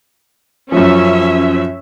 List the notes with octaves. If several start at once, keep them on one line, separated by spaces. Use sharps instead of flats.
F#2 F3 C#4 E5